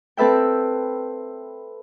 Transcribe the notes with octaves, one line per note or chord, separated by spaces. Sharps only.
C4 A4 B4 E5 G5